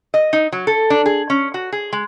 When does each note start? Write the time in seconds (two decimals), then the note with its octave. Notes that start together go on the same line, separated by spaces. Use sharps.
0.14 D#5
0.33 D#4
0.52 F#3
0.67 A4
0.90 D4
1.06 G#4
1.30 C#4
1.54 F#4
1.72 G#4
1.93 G#3